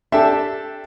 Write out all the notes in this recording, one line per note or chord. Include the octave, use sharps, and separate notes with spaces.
D4 G4 A4 E5